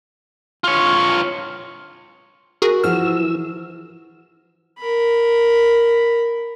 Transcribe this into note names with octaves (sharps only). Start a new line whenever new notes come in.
F4 C#5
F#4 G#4 A#4
E3 F3 F#4 E6 F6
A#4 B5